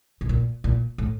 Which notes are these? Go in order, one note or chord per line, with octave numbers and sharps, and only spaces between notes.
B2
A#2
A#2
A2